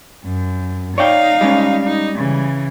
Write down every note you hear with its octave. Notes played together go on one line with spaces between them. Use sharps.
F#2
D#4 C#5 D5 F5 G5
G3 G#3 C#4
D#4
C#3 E3